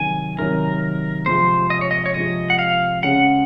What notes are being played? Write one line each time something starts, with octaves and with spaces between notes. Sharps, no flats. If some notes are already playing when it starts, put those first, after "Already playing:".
Already playing: C3 D#3 F#3 G#5
C3 D#3 F#3 A#4
C3 F3 G#3 C4 C5
D#5
C#5
D#5
C#5
C3 F3 G#3 C4 D#5
F#5
F5
C#3 G#3 C#4 F#5